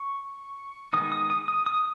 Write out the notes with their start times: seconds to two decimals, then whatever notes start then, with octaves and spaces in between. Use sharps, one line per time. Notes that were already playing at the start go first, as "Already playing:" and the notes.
Already playing: C#6
0.93 D#3 G#3 B3 D#4 D#6
1.12 D#6
1.30 D#6
1.48 D#6
1.66 D#6